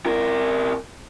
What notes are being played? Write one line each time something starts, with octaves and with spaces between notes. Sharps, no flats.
C3 A#4